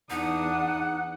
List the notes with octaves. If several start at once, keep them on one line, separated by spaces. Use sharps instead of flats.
E2 D4 D#4 F#5 D#6